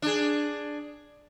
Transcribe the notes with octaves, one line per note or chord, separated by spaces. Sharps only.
D4 G#4